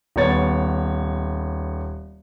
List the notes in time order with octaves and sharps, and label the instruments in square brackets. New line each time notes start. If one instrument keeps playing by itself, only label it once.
[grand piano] D#1 B3 C#5 A6